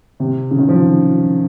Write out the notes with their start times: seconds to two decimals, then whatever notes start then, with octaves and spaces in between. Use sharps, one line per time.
0.20 C3
0.51 C#3
0.58 D#3
0.69 F3